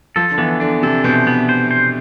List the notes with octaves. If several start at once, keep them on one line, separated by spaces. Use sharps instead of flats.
F3 A4
D3
E3 B3
D3 D4
C3 A4
B2 C5
B3
C5
C5